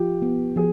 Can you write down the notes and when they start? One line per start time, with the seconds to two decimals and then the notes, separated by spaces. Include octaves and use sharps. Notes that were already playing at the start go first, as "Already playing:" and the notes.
Already playing: F3 F4 G4
0.22 B3
0.56 F3 G#4